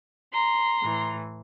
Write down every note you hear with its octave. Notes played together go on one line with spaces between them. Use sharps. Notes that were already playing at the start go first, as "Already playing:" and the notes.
A#5 C6
A2 E3